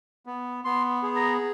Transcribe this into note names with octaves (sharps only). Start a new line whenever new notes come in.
B3
B3 C6
G#4
A#5